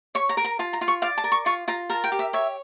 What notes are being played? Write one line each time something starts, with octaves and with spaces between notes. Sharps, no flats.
C#5 C#6
A#5
A#4
A#5
F4 A5
A#5
F4
C#6
D5 F5
A5
A#4
C#6
F4 C#6
F4 A#5
A#4 A5
G5
G4
E5
C#5 E5